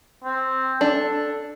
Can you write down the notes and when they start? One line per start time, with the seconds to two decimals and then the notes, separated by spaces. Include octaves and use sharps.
0.24 C4
0.81 D4 A4